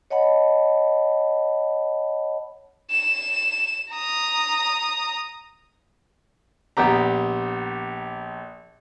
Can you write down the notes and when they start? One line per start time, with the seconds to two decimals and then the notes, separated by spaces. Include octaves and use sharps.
0.10 C#5 D#5 F#5 A5 B5
2.91 E7
3.91 A#5 D#6
6.77 A#1 B3 G4 A#5